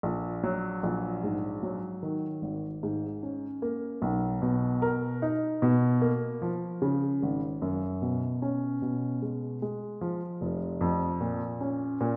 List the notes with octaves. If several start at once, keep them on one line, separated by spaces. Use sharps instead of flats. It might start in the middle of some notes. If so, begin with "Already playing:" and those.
A#1
F#3
A#1
G#2
F#3
D#3
G#1
G#2
C#4
A#3
B1
B2
A#4
D#4
B2
A#3
F3
C#3
G#1
F#2
B2
C#4
B2
G#3
G#3
F3
F1
F2
A#2
C#4
A#2